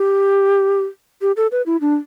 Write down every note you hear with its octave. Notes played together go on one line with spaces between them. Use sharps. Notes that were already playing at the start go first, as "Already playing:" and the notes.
Already playing: G4
G4
A4
B4
E4
D4